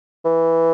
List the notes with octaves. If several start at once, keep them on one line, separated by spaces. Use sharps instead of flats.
E3